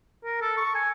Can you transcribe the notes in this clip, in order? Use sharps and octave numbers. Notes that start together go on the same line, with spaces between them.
A#4
A4
C#6
G#5